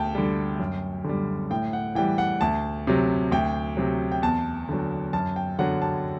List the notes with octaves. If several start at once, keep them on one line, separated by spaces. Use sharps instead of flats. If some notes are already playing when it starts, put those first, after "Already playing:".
Already playing: D2 G5 A5
D3 G3
F#2
D3 G3
A2 G5
F#5
E3 G3 G5
F#5
D2 A5
C3 F#3
D2 G5
C3 F#3
G5
E2 A5
D3 F#3
F#2 A5
G5
D3 F#3 F#5
A5